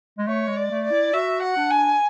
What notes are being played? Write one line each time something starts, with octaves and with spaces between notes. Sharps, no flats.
G#3
A3 C#5
G#3
D5
A3
D5
E4
F#4 E5
F#5
D4
G#5